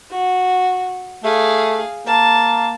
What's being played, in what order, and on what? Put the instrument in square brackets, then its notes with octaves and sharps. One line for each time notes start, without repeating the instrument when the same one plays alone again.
[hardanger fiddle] F#4
[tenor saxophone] A3 [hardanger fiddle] G#4 F5
[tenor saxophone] A#3 [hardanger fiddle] A5